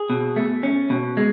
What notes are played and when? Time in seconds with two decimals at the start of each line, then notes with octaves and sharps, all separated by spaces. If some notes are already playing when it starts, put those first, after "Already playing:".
Already playing: G#4
0.10 B2
0.36 A3
0.63 C#4
0.90 B2
1.17 G#3